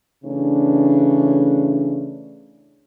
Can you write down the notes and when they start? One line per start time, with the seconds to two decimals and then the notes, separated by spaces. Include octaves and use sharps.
0.24 C#3 E3 A3 C#4 D4